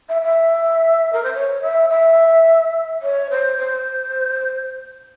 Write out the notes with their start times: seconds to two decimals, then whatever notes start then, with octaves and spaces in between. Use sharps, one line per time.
0.09 E5
0.22 E5
1.12 A#4
1.23 C5
1.33 C#5
1.62 E5
1.89 E5
3.01 C#5
3.30 C5
3.58 C5